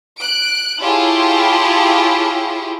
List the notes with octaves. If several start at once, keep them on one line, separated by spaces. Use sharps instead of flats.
F#6 D7
E4 F4 G4 G#4 C#5 A5